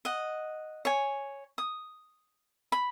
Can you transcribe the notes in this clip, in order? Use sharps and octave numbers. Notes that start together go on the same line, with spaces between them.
D#5 F#5
C#5 G#5
D#6
B5